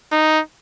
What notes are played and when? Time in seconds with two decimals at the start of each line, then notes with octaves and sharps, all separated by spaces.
0.12 D#4